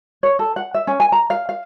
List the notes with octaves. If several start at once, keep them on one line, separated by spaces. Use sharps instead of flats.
C#5
A4
F#5
E5
C#4
G#5
A#5
F5
F5